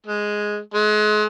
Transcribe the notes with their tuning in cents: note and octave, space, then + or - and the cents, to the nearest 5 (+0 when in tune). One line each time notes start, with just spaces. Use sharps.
G#3 +0
G#3 +35